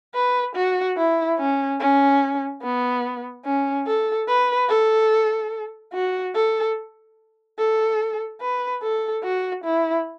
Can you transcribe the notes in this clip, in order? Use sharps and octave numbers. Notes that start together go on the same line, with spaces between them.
B4
F#4
E4
C#4
C#4
B3
C#4
A4
B4
A4
F#4
A4
A4
B4
A4
F#4
E4